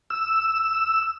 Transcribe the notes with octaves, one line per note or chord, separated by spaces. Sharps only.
E6